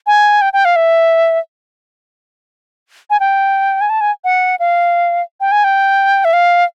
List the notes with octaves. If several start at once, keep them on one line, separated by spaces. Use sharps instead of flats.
G#5
G5
G5
F5
E5
G#5
G5
G#5
A5
G#5
F#5
F5
G5
G#5
G5
E5
F5